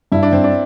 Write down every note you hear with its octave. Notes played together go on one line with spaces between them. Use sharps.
G2 E4
D4
G2 C4
D4